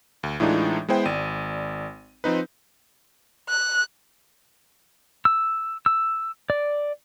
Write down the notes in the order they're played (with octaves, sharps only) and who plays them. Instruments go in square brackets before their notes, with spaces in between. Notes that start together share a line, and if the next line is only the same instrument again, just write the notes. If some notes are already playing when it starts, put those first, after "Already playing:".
[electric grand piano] D2
A2 E3 G#3 D4 D#4 F4
G#3 B3 E4 C5 G5
G#1 D5 D#7
F3 C4 D#4 B4
[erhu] F#6
[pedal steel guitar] E6
E6
D5